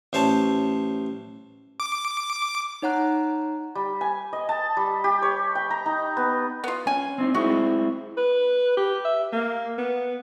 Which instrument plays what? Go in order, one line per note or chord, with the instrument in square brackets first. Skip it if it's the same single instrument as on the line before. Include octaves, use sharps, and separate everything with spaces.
[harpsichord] A1 C5 C#5 A5
[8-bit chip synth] D6
[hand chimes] D#4 C#5 F#5 A#5 F#6
[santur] G3
G#5
D#5
A5
G3
G4
C#5
G5
A#5
D#4
B3
[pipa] B3 F4
[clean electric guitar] C#4 [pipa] G#5
[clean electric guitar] C4 D4 D#4
[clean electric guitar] G#3 C4 E4 [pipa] F#4
[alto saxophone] B4
G4
E5
A#3
B3